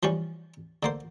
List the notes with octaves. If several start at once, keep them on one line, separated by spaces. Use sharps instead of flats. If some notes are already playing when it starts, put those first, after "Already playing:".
E3 F3 G3 C#4
D3 A#3 C5